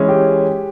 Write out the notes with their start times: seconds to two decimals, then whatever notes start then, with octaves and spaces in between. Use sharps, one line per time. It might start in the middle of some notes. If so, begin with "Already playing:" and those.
Already playing: E3 G#3 C#4 E4
0.09 G4